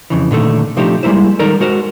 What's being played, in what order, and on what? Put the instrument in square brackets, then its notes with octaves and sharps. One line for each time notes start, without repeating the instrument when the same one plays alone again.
[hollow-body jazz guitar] F2 C#3 E3
A#2 D3 D#3 A3
C3 F3 A3 D4 D#4 G4
G3 G#3 A#3 E4 C5
D#3 G3 D#4 A4 A#4 D5
G#3 F#4 A#4 C5